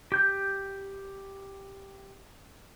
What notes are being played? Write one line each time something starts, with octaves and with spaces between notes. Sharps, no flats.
G4 G6